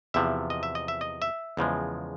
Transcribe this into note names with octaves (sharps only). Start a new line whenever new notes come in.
E2 C3 F3 E5
D#5
E5
D#5
E5
D#5
E5
E2 C#3 F3 G#3